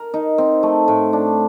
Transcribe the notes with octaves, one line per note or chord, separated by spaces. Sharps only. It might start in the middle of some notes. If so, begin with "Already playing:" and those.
Already playing: A#4
D#4
C4
A3
A2
D4